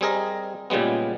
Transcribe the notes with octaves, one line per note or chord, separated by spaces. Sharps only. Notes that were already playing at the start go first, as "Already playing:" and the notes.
G3 C4 G#4 A#4 D#5
A#2 C#3 G3 G#3 B3